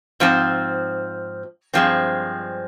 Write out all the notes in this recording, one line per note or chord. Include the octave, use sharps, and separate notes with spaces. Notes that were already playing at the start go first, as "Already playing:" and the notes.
G#2 F3 C4
G2 F3 G#3 C4